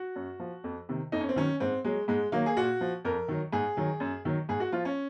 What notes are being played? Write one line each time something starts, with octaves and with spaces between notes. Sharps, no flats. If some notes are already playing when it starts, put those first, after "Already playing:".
Already playing: F#4
F#2
F3
F2
C3 D#3
F2 D#4
C#4
C4
D#3 F#3 C#4
G#2 C4
F#3 G#3
G#2 G#3
D#3 F#3 A#3
G#4
A#2 F#4
F3
F2 A#4
D#3 F#3
G#2 G#4
D#3 F#3
F#2
D#3 F#3
G#2 G#4
F#4
F3 F4
C#4